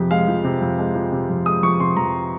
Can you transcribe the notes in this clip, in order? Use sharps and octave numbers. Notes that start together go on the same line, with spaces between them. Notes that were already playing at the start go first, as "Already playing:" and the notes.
Already playing: F2 C3 F3 G#3 G4
G#3 F5
F3
C3
F2
G#3
F3
C3
F2
G#3 D#6
F3 C#6
C3 C6
F2 A#5